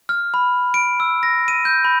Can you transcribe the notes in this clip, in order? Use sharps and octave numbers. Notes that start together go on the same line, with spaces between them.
F6
B5
D7
E6
A#6
D#7
G6
B5